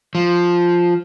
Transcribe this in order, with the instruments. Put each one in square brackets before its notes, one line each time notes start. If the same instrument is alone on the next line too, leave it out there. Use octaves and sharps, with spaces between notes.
[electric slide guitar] F3